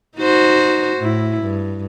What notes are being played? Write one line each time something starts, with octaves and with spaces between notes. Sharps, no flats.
D#4 F#4 C5
A2 E4
G2